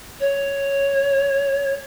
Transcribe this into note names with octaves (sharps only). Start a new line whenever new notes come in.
C#5